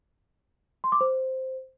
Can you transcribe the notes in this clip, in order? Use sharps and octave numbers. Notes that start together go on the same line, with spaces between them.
C6
D6
C5